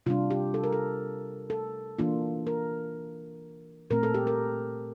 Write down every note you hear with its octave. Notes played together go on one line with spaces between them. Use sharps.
C3 G3 D4 F4
G4
A4
A#4
A4
A4
E3 A#3 D4 F4
A#4
A#2 A3 C4 A#4
A4
G4
A#4